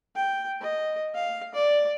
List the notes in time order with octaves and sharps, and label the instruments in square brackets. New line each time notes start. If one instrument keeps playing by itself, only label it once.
[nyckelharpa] G5
D#5
F5
D5